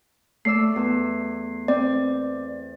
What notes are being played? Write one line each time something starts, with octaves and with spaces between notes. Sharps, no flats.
A3 D5 E6 C7
E2
C4 D5